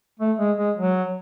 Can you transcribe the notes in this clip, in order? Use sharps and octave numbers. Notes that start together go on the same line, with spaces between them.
A3
G#3
G#3
F#3